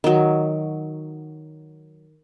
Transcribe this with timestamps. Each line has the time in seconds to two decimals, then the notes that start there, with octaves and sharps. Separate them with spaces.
0.04 D#3 F#3